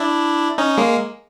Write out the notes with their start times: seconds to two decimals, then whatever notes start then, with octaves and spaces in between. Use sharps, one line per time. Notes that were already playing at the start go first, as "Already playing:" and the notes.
Already playing: D4 E4
0.58 C#4 D#4
0.78 G#3 A#3